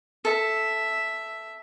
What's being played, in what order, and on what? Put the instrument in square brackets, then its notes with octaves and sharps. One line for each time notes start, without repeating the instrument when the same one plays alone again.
[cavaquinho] A4 [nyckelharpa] E5